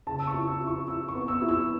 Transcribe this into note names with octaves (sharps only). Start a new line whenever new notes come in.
C#3 A5
E6
C#6
E4
E6
E4
C#6
E4 E6
C#6
B3
E6
E4
E6